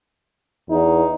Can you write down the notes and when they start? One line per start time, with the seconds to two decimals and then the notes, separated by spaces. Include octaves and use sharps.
0.71 E2 D#4